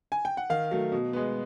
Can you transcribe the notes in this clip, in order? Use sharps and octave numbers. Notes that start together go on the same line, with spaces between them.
G#5
G5
F#5
D#3 F5
F#3 A3
B2
G#3 B3